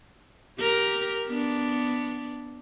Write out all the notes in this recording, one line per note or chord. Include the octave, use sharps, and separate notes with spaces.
G4 A#4
B3 D4